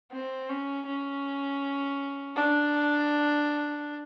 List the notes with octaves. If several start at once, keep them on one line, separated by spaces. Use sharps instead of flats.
C4
C#4
C#4
D4